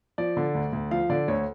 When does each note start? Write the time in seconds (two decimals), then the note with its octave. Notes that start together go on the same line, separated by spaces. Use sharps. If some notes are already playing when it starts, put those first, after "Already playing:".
0.18 F3 D5
0.37 D3
0.55 D2
0.73 D2
0.91 F3 F5
1.10 D3 D5
1.28 D2 C#5